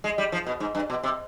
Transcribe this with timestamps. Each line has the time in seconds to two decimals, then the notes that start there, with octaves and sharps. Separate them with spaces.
0.04 G#3
0.18 G3
0.32 F3
0.46 B2
0.60 G#2
0.75 G2
0.90 B2
1.03 C3